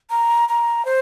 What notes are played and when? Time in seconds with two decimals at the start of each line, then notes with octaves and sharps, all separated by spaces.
0.10 A#5
0.49 A#5
0.85 C5